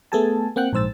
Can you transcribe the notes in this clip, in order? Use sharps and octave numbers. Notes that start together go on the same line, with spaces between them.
A3 B3 G#4 A4 G#5 A5
A#3 C4 F#5 G5 F#6
A#1 G#2 C5 E6 A6